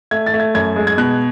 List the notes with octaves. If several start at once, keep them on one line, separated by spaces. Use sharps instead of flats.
A3 G#6
A6
A3
G#6
F#2 G#6
G#3
G#6
B2 F#6